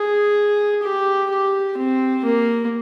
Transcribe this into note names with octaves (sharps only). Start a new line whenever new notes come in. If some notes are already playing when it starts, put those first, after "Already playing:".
Already playing: G#4
G4
G4
C4
A#3